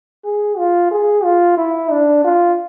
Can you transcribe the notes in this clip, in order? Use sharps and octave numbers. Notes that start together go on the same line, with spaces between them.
G#4
F4
G#4
F4
E4
D4
F4